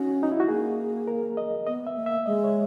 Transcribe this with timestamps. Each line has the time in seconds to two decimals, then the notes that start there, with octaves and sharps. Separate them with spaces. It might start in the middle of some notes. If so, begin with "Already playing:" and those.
Already playing: C#4 D#4 F#4
0.23 D#4
0.32 E4
0.40 F#4
0.48 A#3 G#4
1.08 A#4
1.37 D#5
1.66 B3 D#5
1.87 E5
1.96 A#3
2.06 E5
2.26 G#3 D#5
2.44 C#5